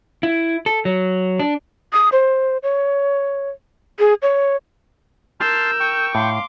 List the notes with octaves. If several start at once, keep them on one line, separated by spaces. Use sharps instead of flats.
E4
A4
F#3
D4
D#6
C5
C#5
G#4
C#5
A#4 A5 C6 E6 F6 G6
G5 C#6
A2 F5 C6 D6